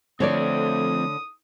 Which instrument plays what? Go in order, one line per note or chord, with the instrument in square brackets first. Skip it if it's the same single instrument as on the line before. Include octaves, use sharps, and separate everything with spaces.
[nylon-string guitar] D3 C#5 D5 [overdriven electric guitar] F3 C4 [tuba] A3 [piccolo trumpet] D#6